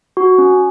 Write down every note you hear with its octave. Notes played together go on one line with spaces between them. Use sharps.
F#4
C#4